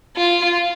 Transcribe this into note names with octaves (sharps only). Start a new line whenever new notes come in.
F4